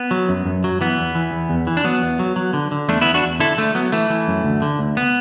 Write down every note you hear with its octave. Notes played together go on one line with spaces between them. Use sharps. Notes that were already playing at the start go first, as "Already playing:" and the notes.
Already playing: B3
F#3
F#2
F#2
F#3
E3 B3
E2
E3
E2
E2
E3
D4
F#3 B3
E2
F#3
F#3
D3
D3
E2 A3 D4
E2 B3 E4
D4 F#4
E2
D3 E4 A4
D3 A3
F#3 B3
E3 A3
E3
F#2
D2
D3
D2
B3